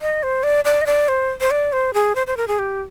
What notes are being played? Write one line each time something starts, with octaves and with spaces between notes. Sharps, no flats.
D#5
C5
D5
D5
D#5
D5
C5
C5
D5
C5
G#4
C5
C5
A#4
G#4
G4